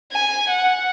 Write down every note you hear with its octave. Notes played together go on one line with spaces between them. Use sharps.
G#5
F#5